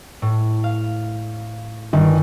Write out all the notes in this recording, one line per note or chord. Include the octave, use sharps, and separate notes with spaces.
A2
F5
G1 D#3